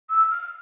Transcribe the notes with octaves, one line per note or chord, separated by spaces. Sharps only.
E6
F6